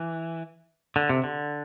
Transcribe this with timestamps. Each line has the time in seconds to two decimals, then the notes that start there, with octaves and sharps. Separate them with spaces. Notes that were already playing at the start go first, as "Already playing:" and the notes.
Already playing: E3
0.96 D3
1.09 C3
1.24 D3